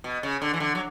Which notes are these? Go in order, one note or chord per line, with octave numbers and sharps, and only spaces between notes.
B2
C#3
D3
E3
D3
F#3